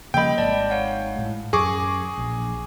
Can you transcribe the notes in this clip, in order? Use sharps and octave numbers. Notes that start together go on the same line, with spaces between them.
C#3 F3 G3 A#3 D#5 G5 B5
G#1 G#2 D5 A5
C#5 F5 F#5
A2 G#3
F#2 G#4 C#6 D6 A#6
A#1